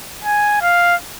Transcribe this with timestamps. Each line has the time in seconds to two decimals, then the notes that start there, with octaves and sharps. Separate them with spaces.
0.24 G#5
0.62 F5